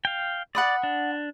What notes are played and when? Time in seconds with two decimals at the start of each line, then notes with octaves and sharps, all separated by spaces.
0.05 F5 G5
0.55 D5 F#5 B5 D#6
0.83 D4